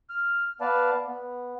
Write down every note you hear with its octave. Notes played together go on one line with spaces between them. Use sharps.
F6
B3 B4 D5 F5 A5
B3